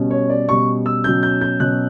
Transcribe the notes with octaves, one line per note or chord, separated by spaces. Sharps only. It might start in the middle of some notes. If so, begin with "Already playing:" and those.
Already playing: B2 G3 C#4
C#5
D5
B2 G3 C#4 C#6
E6
B2 F#3 C#4 G6
G6
G6
B2 F#3 C#4 F#6